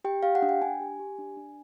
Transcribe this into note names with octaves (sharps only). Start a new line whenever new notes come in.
G4 G5
G4 F5
F#5
D4
G5
D4 G#5
G4
G4
D4
D4